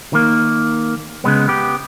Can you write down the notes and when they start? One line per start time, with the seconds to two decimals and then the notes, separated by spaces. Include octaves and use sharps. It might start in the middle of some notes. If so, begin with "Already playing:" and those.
0.13 D#3 A#3
1.24 C#3 G#3 B3
1.48 B3 G4